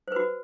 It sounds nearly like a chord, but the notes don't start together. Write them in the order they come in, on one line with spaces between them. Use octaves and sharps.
C5 B4 F#4